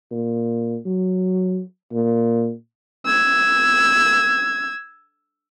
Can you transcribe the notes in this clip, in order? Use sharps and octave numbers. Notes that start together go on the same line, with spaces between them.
A#2
F#3
A#2
E6 G#6